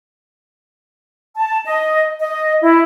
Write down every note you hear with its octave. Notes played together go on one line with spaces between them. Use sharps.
A5
D#5
D#5
E4